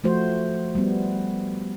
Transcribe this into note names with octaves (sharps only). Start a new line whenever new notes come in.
F3 A3 F#4 C5
G3 B3